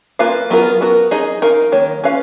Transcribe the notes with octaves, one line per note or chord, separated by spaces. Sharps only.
A#3 F4 B4 F5
F#3 B3 F4 A#4
B3 F#4 A#4
D#4 G#4 D#5
D#4 A#4 F5
D#3 A#3 C#5
C#4 F4 B4 F5